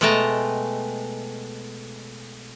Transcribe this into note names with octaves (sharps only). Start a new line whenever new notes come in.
B2 G#3 A3 G5 A5 A#5